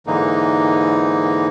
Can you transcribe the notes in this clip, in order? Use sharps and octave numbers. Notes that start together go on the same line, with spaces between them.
G#2 D3 E3 A#3 D#4